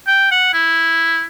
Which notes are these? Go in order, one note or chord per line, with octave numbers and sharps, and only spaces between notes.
G5
F#5
E4